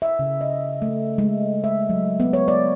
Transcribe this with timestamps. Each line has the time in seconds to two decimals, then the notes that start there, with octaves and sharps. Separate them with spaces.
0.02 E5
0.19 C#3
0.41 D#5
0.82 A3
1.18 G#3
1.64 E5
1.89 F#3
2.20 B3
2.33 C#5
2.48 D5